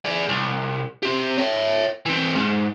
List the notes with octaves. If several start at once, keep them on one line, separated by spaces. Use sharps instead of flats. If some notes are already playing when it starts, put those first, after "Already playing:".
G#4 D5
C2
C4 G4
C#5 E5
E3 C4
G#2